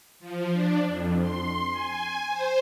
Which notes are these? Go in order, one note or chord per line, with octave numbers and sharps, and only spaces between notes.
F3
D4
F2
C6
G#5
C5